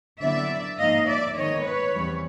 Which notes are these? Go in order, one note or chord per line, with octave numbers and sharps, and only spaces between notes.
D3 F#3 B3 E4 D5 E5
G#2 F3 A#3 D#4 D#5 F5
D5 E5
D#3 G#3 B3 C#5 D#5
B4 C#5
E2 C3 E3 G3